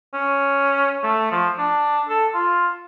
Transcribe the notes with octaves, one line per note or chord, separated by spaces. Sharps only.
C#4
A3
F3
D4
A4
F4